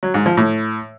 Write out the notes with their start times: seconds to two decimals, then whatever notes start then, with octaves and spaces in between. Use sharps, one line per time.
0.03 F#3
0.14 G#2
0.26 F3
0.37 A2